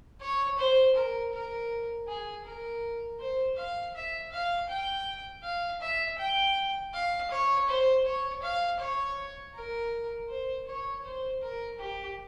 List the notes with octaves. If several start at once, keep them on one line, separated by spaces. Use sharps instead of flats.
C#5
C5
A#4
A#4
G#4
A#4
C5
F5
E5
F5
G5
F5
E5
G5
F5
C#5
C5
C#5
F5
C#5
A#4
C5
C#5
C5
A#4
G4